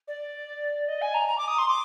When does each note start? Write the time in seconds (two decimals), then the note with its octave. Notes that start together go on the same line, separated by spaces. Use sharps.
0.08 D5
0.88 D#5
1.01 G#5
1.14 A#5
1.28 A#5
1.38 D6
1.48 D#6
1.58 C6
1.68 D6